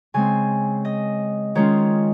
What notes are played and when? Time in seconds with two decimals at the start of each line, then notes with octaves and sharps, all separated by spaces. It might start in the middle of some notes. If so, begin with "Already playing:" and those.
0.14 C#3 G#3 C4 G#5
0.85 D#5
1.55 D#3 G#3 C#4 F4 C#5